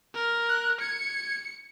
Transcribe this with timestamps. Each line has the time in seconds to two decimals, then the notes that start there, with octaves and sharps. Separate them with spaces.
0.14 A#4
0.48 F#6
0.80 G#6 C#7